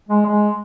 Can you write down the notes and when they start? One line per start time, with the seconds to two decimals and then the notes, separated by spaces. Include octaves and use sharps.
0.09 G#3
0.26 G#3